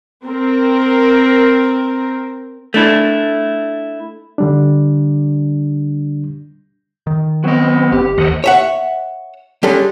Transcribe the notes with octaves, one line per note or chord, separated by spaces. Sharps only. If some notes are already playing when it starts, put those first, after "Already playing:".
C4 A#4
A3 D4 E4
D3 G3 D4
D#3
F#3 B3 C4 D#5
G1 G4
D#2 D#3 A#3 C5 D#5 F#5
C#5 E5 F#5
G3 G#3 C#4 D4 A4